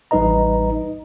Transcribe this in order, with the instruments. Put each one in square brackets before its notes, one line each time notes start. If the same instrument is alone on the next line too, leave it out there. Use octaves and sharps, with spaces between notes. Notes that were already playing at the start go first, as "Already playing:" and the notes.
[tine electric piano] A1 G3 D#4 B4 D#5 A#5